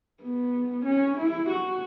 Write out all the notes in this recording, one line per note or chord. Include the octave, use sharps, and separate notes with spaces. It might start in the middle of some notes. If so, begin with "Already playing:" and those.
B3
C#4
E4
F#4